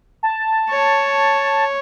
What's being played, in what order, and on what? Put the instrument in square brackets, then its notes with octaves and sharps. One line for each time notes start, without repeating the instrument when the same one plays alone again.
[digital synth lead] A5
[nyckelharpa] C#5